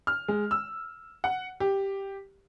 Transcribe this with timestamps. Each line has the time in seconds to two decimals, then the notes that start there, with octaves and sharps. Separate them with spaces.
0.07 F6
0.28 G#3
0.51 E6
1.24 F#5
1.60 G4